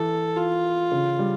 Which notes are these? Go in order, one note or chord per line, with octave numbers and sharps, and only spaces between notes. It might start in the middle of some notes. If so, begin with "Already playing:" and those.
Already playing: E3 A4
F4
C#3
G3